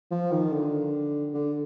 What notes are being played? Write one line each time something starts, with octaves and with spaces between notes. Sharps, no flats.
F3
D#3
D3
D3